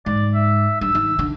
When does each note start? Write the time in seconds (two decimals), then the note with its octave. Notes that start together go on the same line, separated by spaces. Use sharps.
0.06 G#2 D5
0.34 E5
0.81 G2 E6
0.95 D#3
1.19 D3